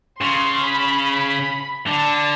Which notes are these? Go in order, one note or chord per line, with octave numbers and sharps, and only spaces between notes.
C#3 C6
B5
B5
D3 A5